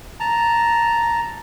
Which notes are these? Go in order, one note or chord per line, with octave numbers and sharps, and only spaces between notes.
A5 A#5